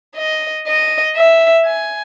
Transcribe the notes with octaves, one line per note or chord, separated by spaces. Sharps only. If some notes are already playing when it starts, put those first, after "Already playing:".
D#5
D#5
E5
G#5